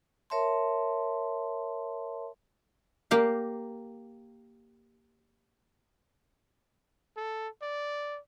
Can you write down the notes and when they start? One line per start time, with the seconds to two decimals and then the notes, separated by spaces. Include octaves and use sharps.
0.30 A#4 C#5 E5 A5 C6
3.11 A#3 G4 F5
7.16 A4
7.62 D5